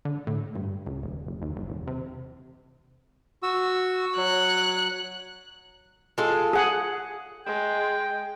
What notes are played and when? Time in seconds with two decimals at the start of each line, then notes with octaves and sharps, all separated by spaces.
0.05 D3
0.27 A2
0.56 G2
0.87 C#2
1.03 D#1
1.27 F#1
1.42 D#2
1.57 G1
1.70 E1
1.87 C3
3.43 F#4 E6
4.17 F#3 C#5 F#6
6.18 G#3 F4 A4
6.53 G#4 F#5
7.46 G#3 G5